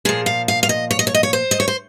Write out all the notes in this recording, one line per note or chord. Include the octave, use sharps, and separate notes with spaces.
A#2 F3 G#4
F5
F5
F5
D#5
C#5
D#5
C#5
D#5
C#5
C5
D#5
C#5
C5